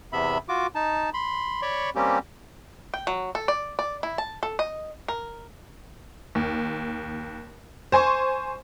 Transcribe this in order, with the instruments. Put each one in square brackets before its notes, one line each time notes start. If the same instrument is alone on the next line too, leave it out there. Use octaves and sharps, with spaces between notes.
[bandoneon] E2 C3 B3 E5 B5
F4 F#4 D6
D#4 A5
B5 C6
C#5 D5 B5 C#6
G3 A#3 C4 C#4 G4
[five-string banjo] G5
F#3
A4
D5
D5
E4
A5
A4
D#5
A#4
[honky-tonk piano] D#2
C5 G#5 C6 C#6